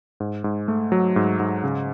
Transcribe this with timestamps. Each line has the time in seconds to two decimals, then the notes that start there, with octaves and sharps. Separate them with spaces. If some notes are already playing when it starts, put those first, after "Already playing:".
0.20 G#2
0.44 G#2
0.68 A3
0.92 F#3
1.16 G#2
1.40 G#2
1.63 C#3